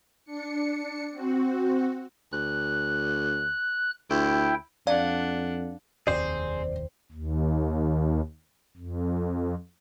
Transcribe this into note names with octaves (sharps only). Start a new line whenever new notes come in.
D4 C#7
C4 F#4
D2 F#6
D2 E4 G5
F2 D4 D5 F5 F#5
F1 D#2 C4 G#4 C5 D5
D#2
F2